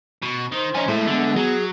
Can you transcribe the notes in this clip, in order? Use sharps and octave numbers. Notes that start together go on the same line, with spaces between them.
B2
D#3 C5
F3 D#4 C#5 G#5
A2 G#3 A4 E5
D3 B3
F#3 G#4